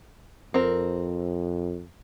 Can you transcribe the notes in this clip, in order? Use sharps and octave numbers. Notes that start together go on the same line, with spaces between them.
F2 C4 A#4